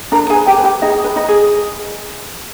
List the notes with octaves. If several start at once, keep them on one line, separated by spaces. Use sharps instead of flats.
D4 A#4 A#5
G#4 G#5
B4
G4 G5
B4
G4 G5
D#4 G#4 D#5
B4
D#4 D#5
G#4